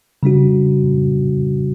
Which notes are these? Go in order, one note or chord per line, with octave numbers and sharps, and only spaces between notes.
C#3 G3 D4 F#4